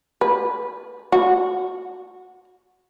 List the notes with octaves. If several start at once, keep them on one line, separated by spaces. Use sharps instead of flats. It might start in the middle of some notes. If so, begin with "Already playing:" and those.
B4
F#4